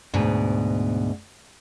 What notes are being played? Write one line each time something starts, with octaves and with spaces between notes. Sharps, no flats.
D2 G#2 B2